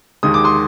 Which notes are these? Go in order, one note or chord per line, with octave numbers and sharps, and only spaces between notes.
D#2 D#3 G#3 D#6
D6
C6 D#6